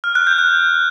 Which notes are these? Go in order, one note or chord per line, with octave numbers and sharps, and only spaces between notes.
F6
F#6
G6
F#6